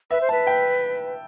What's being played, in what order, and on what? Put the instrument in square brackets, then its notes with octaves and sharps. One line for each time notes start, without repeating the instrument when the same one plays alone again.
[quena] B4 [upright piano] E5
[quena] C5
[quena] B4 [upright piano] A5
[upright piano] G5